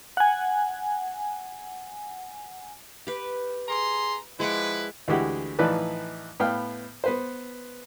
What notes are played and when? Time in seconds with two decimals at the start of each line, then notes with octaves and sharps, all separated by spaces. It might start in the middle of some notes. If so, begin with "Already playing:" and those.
0.17 F#5 G#5
3.07 G4 B4
3.69 G#4 A#5 C6
4.40 F3 G#3 E4 B4 F#5 D6
5.08 D2 E3 G#3 E4 G4 F#5
5.59 A2 E3 F3 D#4 B4 D5
6.40 A2 B3 F5 G5 F6
7.04 B3 B4 C5